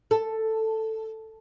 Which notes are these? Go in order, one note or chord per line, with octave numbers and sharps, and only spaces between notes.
A4